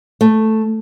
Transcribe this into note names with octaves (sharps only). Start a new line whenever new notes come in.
A3